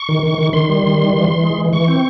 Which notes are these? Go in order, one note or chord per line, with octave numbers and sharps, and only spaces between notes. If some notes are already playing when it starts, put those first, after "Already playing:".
Already playing: C#6
D#3
D#3
D#3
D#3 C6
G3
D#3
G3
E3
E3
G#3
E3
E3 C#6
C4